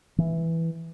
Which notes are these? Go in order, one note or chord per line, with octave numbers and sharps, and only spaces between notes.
E3